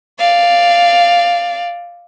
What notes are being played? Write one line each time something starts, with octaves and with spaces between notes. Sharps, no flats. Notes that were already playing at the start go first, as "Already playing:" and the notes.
D5 F5